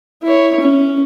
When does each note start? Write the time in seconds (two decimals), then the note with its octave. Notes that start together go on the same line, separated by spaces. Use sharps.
0.23 E4 C#5
0.61 C#4